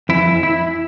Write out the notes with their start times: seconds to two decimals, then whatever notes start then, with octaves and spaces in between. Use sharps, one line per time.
0.09 F2 E3 E4
0.43 E4